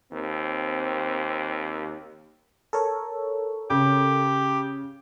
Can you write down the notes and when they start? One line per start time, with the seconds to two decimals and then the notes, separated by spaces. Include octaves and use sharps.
0.12 D#2 C4
2.73 A4 A#4 C#5
3.70 C#3 G4